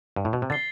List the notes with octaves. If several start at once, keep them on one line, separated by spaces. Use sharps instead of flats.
G2
A2
B2
C3
D3 A6 C7 G7